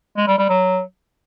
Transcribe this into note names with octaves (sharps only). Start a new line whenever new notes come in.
G#3
G3
G3
F#3